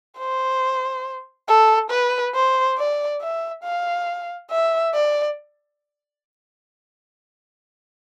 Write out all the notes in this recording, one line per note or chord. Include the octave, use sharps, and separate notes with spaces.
C5
A4
B4
C5
D5
E5
F5
E5
D5